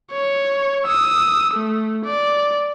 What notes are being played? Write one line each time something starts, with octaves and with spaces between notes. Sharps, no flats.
C#5
D#6 E6
A3
D5